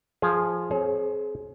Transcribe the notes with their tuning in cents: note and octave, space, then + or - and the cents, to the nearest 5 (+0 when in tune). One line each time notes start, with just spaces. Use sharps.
F3 +0 G#4 +0 F5 +0
C4 +0 G#4 +30 C#5 -15